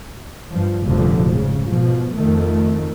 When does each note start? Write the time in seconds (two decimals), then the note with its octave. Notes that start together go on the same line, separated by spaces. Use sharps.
0.49 G2 F3
0.84 F1 D2 G2 A#2 D3 F3
1.29 G#2 C#3
1.68 B2 F3
2.16 F2 D#3 A3